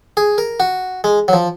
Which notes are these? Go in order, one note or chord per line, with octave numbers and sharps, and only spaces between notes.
G#4
A#4
F#4
G#3
F#3
F3